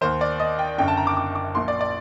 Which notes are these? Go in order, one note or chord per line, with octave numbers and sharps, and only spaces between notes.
D#2 D#3 C5
D5
D#5
G5
F#1 F#2 D3 G5
A5
A#5
D6
D6
D6
A#1 A#2 C6
D5
D5